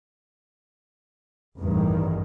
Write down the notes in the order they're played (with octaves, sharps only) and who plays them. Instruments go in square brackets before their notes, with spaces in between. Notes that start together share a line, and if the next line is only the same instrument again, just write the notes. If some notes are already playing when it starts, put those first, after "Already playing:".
[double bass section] A1 E2 G2 D#3